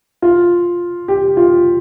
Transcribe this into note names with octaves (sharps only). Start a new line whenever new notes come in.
F4
G4
F4